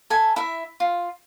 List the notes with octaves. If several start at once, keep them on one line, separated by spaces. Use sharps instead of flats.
A4 E5 G#5
E4 E5
F4